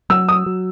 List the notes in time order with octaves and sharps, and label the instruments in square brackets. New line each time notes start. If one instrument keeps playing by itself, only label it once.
[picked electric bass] F#3 [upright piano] E6
[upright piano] D#6
[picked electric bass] F#3